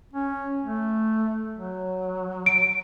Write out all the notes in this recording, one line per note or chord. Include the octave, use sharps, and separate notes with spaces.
C#4
A3
F#3
D7